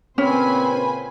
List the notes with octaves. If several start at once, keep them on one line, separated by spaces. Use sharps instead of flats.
A#2 C#3 C4 C#4 B4 C5 G#5 B5